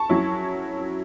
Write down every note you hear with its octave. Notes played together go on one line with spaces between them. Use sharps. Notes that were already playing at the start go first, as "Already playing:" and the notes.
Already playing: A5 C#6
F#3 C#4 E4